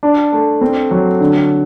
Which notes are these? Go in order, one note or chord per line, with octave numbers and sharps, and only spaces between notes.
D4
A3
C4
F#3
D3